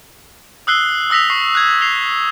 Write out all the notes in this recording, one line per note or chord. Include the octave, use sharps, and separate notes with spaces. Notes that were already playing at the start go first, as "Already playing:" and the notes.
D#6 E6 F#6 C7 G7
D#6 E6 A#6 B6 F7
C#6 C7 G7
F#6 G#6
C7 F7 G7